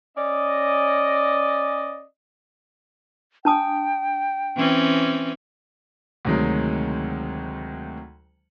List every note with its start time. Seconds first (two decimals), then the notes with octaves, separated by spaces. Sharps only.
0.17 C#4 D5 D#5
3.45 D4 G5 A5 D#6
4.57 E3 C4 C#4
6.25 D2 C3 D#3 F#3 G#3